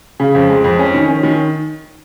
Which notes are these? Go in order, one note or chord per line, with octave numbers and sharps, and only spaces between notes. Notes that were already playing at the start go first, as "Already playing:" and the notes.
C#3
F2
G#3
F2
C#4
D#3
C#4
D#3